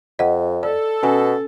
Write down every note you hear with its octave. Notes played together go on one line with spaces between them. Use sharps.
F2 D#5 F#5
A4 D5
B2 C#4 G#5